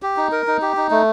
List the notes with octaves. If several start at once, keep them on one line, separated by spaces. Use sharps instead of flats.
G4
D#4
A#4
D#4
G4
D#4
A3